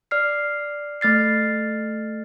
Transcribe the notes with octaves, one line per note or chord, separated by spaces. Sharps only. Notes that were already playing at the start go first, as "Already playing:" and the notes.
D5 F6 C7
A3 F6 A6 C7